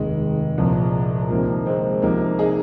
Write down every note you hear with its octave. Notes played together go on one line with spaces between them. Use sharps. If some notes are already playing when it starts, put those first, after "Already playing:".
Already playing: F1 D#2 D#3 G#3
C2 A#2 F3
C2 C3 D#3 F3 A#3
G#3 C4
C2 C3 F3 A#3 D#4
D#4 G#4